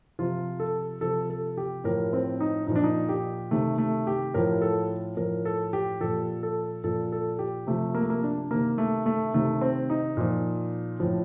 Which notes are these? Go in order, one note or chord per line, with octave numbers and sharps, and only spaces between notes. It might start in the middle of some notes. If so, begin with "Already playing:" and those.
C3 F3 F4
A4
C3 F3 A4
A4
G4
A2 F3 A#4
C4
D#4
A#2 F3 D#4
D4
D#4
G4
C3 D#3 A3
A3
G4
A2 F3 A#4
A4
A2 F3 A#4
A4
G4
A#2 F3 A4
A4
A#2 F3 A4
A4
G4
C3 F3 A3
A#3
A3
A#3
D4
C3 D#3 A#3
A3
A3
C3 D#3 A3
C4
D#4
A#2 F3
A2 F3